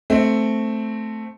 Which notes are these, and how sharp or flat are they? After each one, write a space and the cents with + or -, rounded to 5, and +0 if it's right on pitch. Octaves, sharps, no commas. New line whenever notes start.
A3 +0 C4 +0